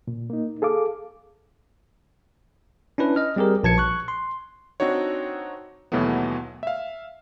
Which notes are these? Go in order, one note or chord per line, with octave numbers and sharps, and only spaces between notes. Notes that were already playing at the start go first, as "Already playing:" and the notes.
A#2
A#3 D#4
G#4 A4 F5 D6
C#4 D4 E4 B4
D#5 F6
G3 C4 G4 G#4 A#4
A#1 A5 G#6 C#7
C#6 F#6
C6
C4 D4 D#4 F#4 C#5
D#2 B2 E3 F#3 A3 B3
E5 F5